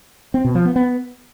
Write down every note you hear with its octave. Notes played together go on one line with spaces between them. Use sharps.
C4
B2
F3
B3
B3